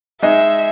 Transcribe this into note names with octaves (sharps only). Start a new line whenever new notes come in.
G#3 D#4 G#4 D#5 E5